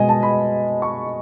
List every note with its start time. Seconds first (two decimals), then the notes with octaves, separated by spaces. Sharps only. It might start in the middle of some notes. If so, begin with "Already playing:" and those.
Already playing: B2 G#3 B3 D#5 G#5
0.09 A5
0.23 B5
0.82 C#6